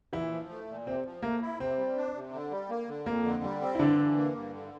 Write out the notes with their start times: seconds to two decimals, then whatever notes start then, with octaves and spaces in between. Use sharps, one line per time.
0.13 A#2 E3 E4
0.32 F3
0.49 A3
0.68 A#2
0.86 C3 C4
1.05 F3
1.22 A3 A#3
1.41 E4
1.60 C3 C4
1.78 G3
1.97 D4
2.15 C3
2.33 D3
2.51 G3
2.70 A#3
2.88 D3
3.06 F2 A#3
3.25 D3
3.43 G3
3.61 C4
3.75 E4
3.79 G2 D3 D4
3.98 E3
4.16 A#3
4.35 G2
4.53 D3